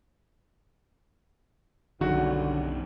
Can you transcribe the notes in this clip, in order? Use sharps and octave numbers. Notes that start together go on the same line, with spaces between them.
B1 F#2 D3 D#3 F#3 G3 F#4